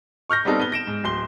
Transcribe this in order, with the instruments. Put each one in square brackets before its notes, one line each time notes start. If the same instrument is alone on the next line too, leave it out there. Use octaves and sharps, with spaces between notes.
[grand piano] C#6 F6 G6 A#6
G3 B3 C4 D#4 A4
B3 G7
A#6 D7 E7
G#2
D1 C6 G7